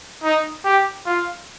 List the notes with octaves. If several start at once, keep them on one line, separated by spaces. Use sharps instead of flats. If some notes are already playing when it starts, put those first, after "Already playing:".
D#4
G4
F4